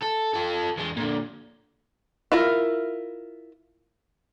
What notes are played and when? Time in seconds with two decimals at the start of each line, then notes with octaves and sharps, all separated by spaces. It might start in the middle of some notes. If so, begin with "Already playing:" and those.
0.03 A4
0.34 F4 A4
0.77 E2 G#3
0.97 A#2 D3
2.32 E4 F4 A#4